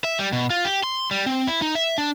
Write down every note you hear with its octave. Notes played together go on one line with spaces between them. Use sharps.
E5
G3
B2
F4
G4
C6
G3
C4
E4
D#4
E5
D4